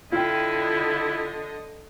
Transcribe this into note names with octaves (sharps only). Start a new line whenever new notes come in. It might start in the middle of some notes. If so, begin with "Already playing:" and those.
D3 E4 F4 D#5 G5